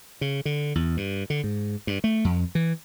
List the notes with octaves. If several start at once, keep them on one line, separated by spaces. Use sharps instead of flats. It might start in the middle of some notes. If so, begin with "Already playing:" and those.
C#3
D3
E2
G2
D3
G#2
G2
A3
F2
E3